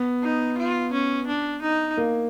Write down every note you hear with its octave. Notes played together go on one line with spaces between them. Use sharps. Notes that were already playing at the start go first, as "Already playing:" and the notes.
Already playing: B3
D#4
F4
C#4
D4
D#4
A#3